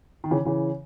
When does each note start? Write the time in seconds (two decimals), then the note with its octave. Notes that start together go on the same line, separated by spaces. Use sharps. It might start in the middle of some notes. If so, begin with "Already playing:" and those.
0.24 D#3
0.31 C#3 E3
0.45 C#3 E3